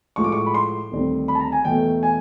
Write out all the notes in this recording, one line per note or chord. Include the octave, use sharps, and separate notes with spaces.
A2 F3 G#3 C#6
D6
C#6
B5
C6
D2 C3 D#3 G3 C4
B5
A5
A#5
G#5
E2 B2 F#3 A3 G5
G#5